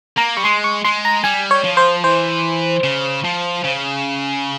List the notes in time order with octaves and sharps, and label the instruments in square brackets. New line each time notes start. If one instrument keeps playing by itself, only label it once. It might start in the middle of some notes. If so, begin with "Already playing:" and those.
[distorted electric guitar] A#3 [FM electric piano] A#5
[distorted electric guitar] G3 [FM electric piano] C#6
[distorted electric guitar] G#3 [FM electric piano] C6
[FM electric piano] C#6
[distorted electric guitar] G#3 [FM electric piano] C6
[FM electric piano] A#5
[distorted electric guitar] G3 [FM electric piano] G#5
[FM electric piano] C#5
[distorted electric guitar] F3
[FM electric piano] C5
[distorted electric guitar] E3 [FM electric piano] C5
[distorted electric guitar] C#3
F3
C#3